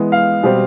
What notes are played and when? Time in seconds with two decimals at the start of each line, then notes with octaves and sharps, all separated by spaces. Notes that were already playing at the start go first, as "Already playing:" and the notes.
Already playing: E3 G#3 B3
0.12 F5
0.43 B2 G3 C4